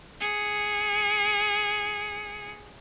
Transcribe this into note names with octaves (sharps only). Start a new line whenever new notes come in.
G#4 C#7